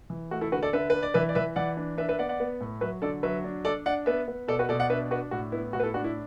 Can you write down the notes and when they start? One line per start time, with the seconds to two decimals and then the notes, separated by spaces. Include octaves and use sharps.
0.10 E3
0.31 A3 F#4
0.41 E4 A4
0.52 D3 F#4 B4
0.63 A4 D5
0.73 D3 B4 E5
0.90 D4 B4
1.03 D5
1.14 E3 B4 E5
1.29 D5
1.35 E3 B4 E5
1.56 E3 D5 F#5
1.77 D4
1.98 D4 B4 E5
2.09 B4 E5
2.19 B3 D5 F#5
2.29 D5 F#5
2.40 B3
2.61 A2
2.81 F#3 B4 E5
3.02 D3 A4 D5
3.23 F#3 B4 E5
3.44 D4
3.65 D4 A4 D5
3.86 D4 D5 F#5
4.06 B3 B4 E5
4.28 B3
4.48 B2 A4 D5
4.59 F#4 B4
4.69 B2 A4 D5
4.80 D5 F#5
4.90 D4 B4 E5
5.11 D4 F#4 B4
5.31 A2 F#4
5.52 B3 E4
5.73 A2 F#4
5.80 B4
5.83 E4 A4
5.94 D4 F#4
6.04 E4